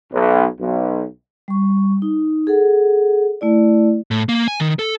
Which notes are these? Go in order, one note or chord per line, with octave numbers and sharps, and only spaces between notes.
B1
B1
G3 C#6
D#4
G#4 A4 F#5
A3 E4 D5
A2
A#3
G#5
D#3
A4